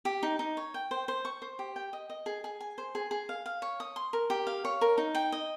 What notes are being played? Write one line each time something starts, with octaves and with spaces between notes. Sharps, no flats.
G4
D#4
D#4
C#5
G5
C5
C5
C#6
C5
G4
G5
D#5
D#5
G#4
G#4
G#5
C5
G#4
G#4
F5
F5
C#5
D#6
C6
A#4
G4
F5
C#5
A#4
D#4
G5
D#5